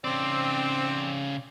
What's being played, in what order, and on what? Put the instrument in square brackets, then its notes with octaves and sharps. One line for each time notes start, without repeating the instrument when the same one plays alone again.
[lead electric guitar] C#3 D5 [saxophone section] C4